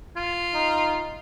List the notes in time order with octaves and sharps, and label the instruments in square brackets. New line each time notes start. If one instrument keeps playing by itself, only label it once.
[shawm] F4
[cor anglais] D#4